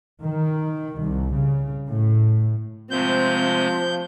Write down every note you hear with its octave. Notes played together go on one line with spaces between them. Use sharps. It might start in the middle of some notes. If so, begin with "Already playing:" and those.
D#3
C2
C#3
A2
C3 F3 G#3 A3 C4 G6